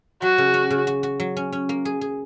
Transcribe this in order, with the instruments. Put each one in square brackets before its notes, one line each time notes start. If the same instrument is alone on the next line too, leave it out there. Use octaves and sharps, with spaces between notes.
[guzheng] F#3 [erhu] F#4
[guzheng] C#3
C#4
C#3
F#4
F#4
F#3
C#4
C#4
A#3
G#4
G#4